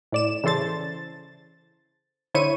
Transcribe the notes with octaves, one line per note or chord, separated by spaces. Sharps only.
A2 D5 E7
C#3 E3 A4 C5 A6
D3 E4 C5 C#5 C#6 D#7